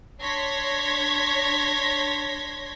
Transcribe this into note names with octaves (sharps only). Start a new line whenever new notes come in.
D4 C#5 C6 G#6 A#6 B6